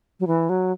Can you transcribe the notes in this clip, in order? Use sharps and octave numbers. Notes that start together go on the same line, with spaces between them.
F#3
E3
F#3